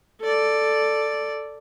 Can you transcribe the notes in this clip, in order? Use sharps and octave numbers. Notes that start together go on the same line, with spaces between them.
A4 D5